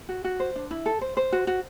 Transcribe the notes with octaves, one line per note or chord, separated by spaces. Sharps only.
F#4
F#4
C5
D4
E4
A4
C5
C5
F#4
F#4